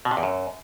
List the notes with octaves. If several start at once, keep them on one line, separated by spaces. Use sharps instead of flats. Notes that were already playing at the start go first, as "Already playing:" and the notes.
B2
C3
E2
F#2